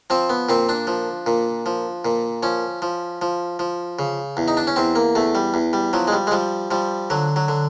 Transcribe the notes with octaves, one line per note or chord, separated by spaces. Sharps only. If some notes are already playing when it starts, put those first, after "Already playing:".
F3 C4
B3
A#2 C4
D4
F3
A#2
F3
A#2
F3 C#4
F3
F3
F3
C#3
E2
D#4
D4
C#4
E2 C4
A#3
E2 A3
G3
E2
G3
F3 F#3
G#3
G3
G#3
F3 G3
F3 G3
D3 F#3
F#3
D3